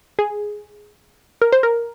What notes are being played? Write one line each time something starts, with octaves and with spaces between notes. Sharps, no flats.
G#4
A#4
C5
A#4